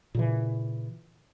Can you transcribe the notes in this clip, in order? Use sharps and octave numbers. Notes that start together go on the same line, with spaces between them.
A#2 C#3 E3